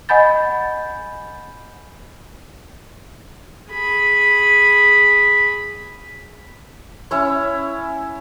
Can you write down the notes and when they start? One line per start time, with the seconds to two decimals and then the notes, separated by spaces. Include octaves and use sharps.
0.09 D#5 F#5 G#5 B5 G6 A6
3.71 G#4 B5
7.11 C#4 E4 C#5